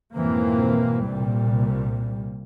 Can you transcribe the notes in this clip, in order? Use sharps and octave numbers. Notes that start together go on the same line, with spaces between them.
F2 G#2 B2 E3 A#3 C4
C2 A#2 G3